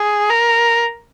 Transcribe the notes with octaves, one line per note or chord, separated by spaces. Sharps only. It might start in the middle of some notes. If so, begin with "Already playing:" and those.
Already playing: G#4
A#4